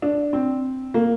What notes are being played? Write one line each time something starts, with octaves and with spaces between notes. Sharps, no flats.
D4
C4
A#3